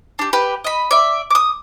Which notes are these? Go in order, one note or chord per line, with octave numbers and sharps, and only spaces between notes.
D4 G4
G4 B4
D#5 B5
D5 E5
D6 D#6